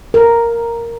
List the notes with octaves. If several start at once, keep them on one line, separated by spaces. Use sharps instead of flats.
A#4